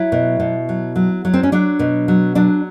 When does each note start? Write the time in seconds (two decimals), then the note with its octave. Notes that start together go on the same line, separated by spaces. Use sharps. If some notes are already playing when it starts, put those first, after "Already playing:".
Already playing: F#3 E4
0.12 B2
0.40 B2
0.69 F#3
0.96 F#3
1.25 F#3
1.34 C4
1.43 C#4
1.52 F#3 D4
1.79 B2
2.08 F#3
2.35 F#3 D4